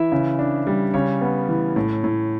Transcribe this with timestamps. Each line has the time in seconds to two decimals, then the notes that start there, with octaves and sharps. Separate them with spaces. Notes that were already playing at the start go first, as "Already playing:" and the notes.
Already playing: E3 E4 E5
0.12 C#3
0.39 D4
0.67 G3
0.94 C#3 C#4 C#5
1.21 B3
1.49 E3
1.76 A2
2.04 A2